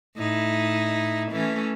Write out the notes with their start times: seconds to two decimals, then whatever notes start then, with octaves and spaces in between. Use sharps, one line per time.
0.16 A2 D#4 E4
1.31 E3 A3 C#4